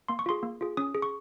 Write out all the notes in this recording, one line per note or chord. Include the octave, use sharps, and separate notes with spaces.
A#3 C6
C#6
F4 G#4 C6
A#3
F4 G#4
C#4 D#6
G#4
C#6